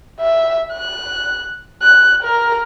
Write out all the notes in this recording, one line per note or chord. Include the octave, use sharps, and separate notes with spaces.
E5
F#6
F#6
A#4